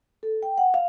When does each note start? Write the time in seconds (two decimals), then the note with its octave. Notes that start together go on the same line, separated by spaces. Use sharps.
0.23 A4
0.43 G5
0.58 F#5
0.74 F5